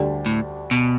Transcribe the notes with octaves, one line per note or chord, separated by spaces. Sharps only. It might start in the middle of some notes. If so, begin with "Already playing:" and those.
Already playing: D2 D3 G3 D4 G4
A2
B2